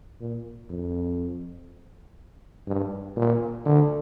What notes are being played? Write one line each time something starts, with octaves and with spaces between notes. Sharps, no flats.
A#2
F2
G2
A#2
D3